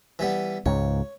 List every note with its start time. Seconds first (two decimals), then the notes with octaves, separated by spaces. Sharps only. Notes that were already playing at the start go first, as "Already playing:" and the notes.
0.19 E3 G3 B3
0.66 C#2 G#2 C#5